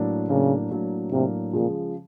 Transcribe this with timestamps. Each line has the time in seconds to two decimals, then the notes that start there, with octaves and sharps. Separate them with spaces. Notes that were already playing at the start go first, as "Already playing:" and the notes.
Already playing: A2 F#3 A#3 D4
0.29 A2 C#3 F#3 A#3 D4
0.71 A2 F#3 A#3 D4
1.12 A2 C3 F#3 A#3 D4
1.53 A#2 C#3 F3 G#3